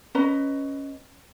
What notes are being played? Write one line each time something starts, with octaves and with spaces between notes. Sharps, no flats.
C#4 B4 D#5 A#5